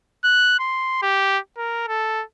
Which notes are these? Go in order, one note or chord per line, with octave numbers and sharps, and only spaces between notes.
F#6
C6
G4
A#4
A4